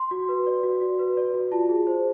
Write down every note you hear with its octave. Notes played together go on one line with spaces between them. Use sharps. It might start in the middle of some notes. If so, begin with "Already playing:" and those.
Already playing: C6
F#4
B4
D5
F#4
F#4
B4
D5
F#4
F4 A5
G#4
C5